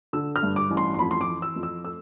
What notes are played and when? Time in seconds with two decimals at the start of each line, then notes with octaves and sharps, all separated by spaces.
0.13 D3 E6
0.36 F6
0.43 G2
0.56 D6
0.71 A1
0.77 C6
0.94 C6
0.99 F2 B5
1.11 C6
1.21 D6
1.27 E3
1.42 E6
1.56 F2
1.63 E6
1.85 A3 E6